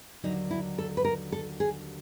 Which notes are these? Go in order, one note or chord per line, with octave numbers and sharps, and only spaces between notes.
D#2 D3 F#3 D#4
E4
A4
B4
A#4
A4
G#4